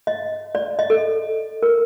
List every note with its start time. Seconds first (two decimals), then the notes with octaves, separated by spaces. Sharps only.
0.07 D#5
0.55 D5
0.79 D#5
0.90 A4
1.63 A#4